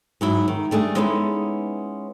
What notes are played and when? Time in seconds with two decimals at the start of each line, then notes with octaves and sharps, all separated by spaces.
0.21 G#2 F#3 E4
0.48 D#3
0.71 G3 A3 D4 G#4
0.96 G#3 B3 C#4 D#4 E4